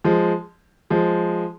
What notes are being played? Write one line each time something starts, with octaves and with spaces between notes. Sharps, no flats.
F3 G#3
F3 G#3